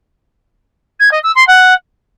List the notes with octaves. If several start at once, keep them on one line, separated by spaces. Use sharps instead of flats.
G#6
D#5
E6
C6
F#5